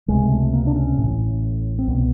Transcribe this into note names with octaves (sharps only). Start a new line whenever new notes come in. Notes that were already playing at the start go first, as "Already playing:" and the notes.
C#2 C3 G#3
A3
A#3
D4
C#4
A1 A2
C4
C2 B2 B3